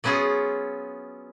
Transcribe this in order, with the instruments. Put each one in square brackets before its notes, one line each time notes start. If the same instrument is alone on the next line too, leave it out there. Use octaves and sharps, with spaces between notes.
[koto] F#3 B3 C#4 F4 G#4